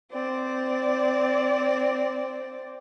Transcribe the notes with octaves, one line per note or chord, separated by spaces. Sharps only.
C4 D5